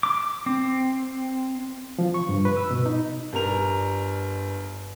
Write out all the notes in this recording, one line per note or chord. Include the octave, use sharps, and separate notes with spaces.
D6
C4
F3
C#6
G2
B4
E6
B2
D#4
G1 G3 A#4 F7